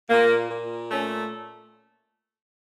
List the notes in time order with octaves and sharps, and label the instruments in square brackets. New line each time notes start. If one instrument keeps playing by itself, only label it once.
[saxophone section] A#2 A#3
A#2
A3 C#4